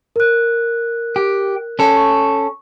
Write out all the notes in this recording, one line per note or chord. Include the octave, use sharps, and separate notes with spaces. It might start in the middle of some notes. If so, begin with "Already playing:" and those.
A#4 F#6
G4
C#4 A4
C#6